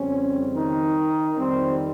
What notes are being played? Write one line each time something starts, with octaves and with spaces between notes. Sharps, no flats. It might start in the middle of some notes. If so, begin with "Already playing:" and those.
Already playing: F2 C#3 G3 C4 C#4
D#3 D#4
F2 D#3 G3 C4